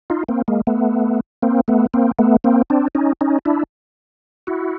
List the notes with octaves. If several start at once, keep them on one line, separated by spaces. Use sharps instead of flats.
D#4 F4
A#3 C4
G#3 A#3
A3 B3
A#3 C4
A3 B3
A#3 C4
A3 B3
A#3 C4
C4 D4
C#4 D#4
C#4 D#4
D4 E4
E4 F#4